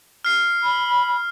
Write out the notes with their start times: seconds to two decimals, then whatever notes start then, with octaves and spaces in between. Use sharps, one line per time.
0.25 F6 C7
0.63 B5